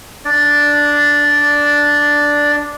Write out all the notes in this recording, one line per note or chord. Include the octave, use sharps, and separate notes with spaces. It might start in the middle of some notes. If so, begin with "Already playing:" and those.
D4 D5